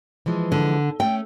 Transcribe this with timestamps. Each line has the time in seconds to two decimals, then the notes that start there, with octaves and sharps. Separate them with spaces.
0.26 E3 F3 G#3
0.52 D3
1.00 A3 C#4 G5